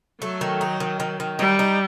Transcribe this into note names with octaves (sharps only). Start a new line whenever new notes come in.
F#3 A3
D#3
D#4
D#3
D#3
D#3
G3 D#4
D#4